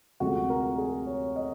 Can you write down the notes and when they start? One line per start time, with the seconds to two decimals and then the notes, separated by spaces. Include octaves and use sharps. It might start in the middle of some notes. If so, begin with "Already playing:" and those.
0.20 D2 C3 F3 G#3 F#4
0.50 A#4
0.78 G#4
1.07 C#5
1.36 D#5